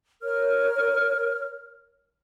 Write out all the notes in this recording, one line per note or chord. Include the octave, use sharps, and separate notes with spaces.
A#4 C#5 F6